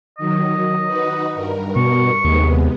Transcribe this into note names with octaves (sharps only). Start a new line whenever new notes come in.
D#3 F#3 D#5
D#4 F#4 B4
G2 A#4
B2 C#6
D#2 C3 G#3 B3